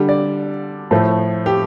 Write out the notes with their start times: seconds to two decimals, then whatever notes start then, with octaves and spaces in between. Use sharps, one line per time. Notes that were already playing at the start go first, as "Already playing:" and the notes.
Already playing: D3 G3
0.09 D5
0.91 A2 F3 A3
1.46 G4